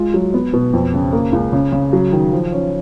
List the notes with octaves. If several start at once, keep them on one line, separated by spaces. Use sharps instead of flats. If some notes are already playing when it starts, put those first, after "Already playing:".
Already playing: G#3 F4
F#3
B3
B2
F2
C#3
A#3
C#2
C#3
C#3
F#3
D#3
F3
C#4